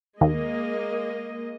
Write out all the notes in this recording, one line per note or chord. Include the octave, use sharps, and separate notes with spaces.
D#2 G#3 A#3 D#5